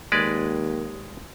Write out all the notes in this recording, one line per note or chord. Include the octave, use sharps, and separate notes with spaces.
D#2 G#3 B4 D5